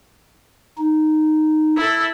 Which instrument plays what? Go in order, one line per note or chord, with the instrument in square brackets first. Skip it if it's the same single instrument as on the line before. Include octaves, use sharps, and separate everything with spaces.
[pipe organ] D#4
[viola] E4 A4